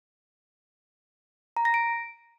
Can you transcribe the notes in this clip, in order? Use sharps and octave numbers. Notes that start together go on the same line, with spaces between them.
A#5
A#6
D7